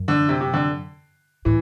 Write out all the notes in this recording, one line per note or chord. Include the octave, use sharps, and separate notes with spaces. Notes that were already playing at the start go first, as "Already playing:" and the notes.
Already playing: F#2
D3
C3
C3
D3
A2 E3